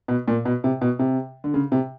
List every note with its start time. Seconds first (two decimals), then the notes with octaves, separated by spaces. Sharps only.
0.08 B2
0.28 A#2
0.45 B2
0.64 C3
0.81 B2
0.99 C3
1.44 D3
1.54 C#3
1.72 C3